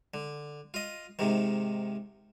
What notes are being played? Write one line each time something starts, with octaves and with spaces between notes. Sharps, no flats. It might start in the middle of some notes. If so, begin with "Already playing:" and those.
D3
F4 D#5
G#2 C3 D#3